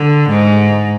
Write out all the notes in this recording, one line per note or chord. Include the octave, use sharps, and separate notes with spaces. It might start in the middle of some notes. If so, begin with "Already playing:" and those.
Already playing: D3
G#2